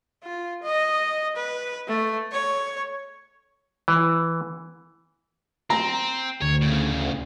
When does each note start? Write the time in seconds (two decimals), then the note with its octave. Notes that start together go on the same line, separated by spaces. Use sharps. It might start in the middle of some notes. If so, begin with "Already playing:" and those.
0.23 F4
0.63 D#5
1.36 B4
1.88 A3
2.32 C#5
3.88 E3
5.70 C4 A#5
6.42 D2 C#5
6.62 A2 C#3